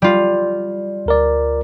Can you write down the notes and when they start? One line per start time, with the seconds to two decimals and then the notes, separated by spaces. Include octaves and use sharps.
0.02 G3 F4
1.06 D2 A#4 D5